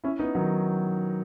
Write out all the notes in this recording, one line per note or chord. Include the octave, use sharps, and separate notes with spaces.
C#4 E4
B3 D#4
D#3 F#3